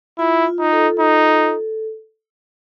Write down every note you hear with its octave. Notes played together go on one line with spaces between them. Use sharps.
E4 F4
F4
D#4
A4
D#4 F4
A4